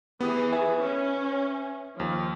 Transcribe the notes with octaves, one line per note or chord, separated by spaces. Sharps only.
E3 B3 G4 G#4 D#6
B4 E5 G#5
C#4
D#2 F3